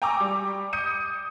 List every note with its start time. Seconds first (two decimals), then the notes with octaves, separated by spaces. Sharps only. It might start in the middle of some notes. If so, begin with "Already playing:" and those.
0.02 G5 G#5 A#5 C#6 D6 E6
0.20 G3
0.73 D#6 G6 C#7 D#7